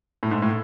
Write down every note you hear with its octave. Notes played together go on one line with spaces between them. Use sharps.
A2
G#2
A2